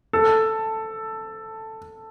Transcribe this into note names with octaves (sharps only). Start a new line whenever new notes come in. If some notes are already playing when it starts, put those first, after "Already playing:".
A4